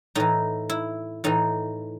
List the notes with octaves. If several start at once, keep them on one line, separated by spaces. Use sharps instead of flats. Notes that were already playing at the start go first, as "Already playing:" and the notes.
A2 E3 D#4
E4
A2 E3 D#4